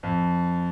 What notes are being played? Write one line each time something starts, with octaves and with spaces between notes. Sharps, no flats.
F2